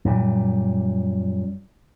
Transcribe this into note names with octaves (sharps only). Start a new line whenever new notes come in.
F#2 A#2 G3